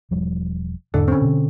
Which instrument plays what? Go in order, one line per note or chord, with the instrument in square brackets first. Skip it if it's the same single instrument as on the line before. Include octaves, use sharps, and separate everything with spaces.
[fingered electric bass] E1 F3 G3
[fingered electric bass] E2 G#2 [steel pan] D3 A4
[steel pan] C4 C#4
[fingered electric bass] B2 D3